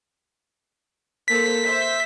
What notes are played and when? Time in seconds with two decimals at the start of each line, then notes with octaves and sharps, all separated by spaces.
1.28 A#3 A4 C5 B6
1.64 C5 E5